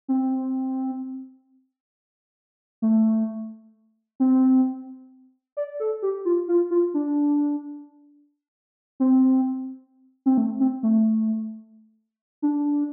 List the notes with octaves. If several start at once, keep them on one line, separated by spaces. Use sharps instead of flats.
C4
A3
C4
D5
A4
G4
F4
F4
F4
D4
C4
C4
A3
C4
A3
D4